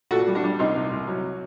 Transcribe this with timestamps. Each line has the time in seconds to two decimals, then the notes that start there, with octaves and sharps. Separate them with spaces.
0.11 A#2 F#4 A4
0.28 G3
0.35 D4 F#4
0.44 G3
0.59 C2 C4 D#4
0.75 C2
0.92 C2
1.07 F#3